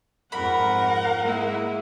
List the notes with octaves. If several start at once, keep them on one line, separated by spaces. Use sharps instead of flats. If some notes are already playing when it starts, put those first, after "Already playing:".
F2 G#2 A#4 F#5 B5
G#3 A#3 E4